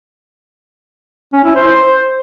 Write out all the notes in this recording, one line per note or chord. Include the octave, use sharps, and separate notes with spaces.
C#4
E4
C5
C5